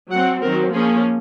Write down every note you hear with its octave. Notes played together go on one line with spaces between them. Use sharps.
F#3 C4 F#5
D#3 F#3 C4 A#4
F3 A#3 C#4 G#4